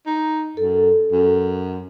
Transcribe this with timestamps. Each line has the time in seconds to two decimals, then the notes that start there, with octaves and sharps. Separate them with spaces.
0.07 D#4
0.57 F#2 A4
1.12 F#2